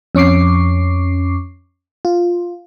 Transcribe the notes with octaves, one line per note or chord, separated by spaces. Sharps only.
F2 C#4 C#6 D6 C7
F4